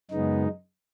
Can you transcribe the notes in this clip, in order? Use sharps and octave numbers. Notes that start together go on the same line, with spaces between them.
F#2 C#3 G#3 B3 D#4